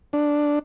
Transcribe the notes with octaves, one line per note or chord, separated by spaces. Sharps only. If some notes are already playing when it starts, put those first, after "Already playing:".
D4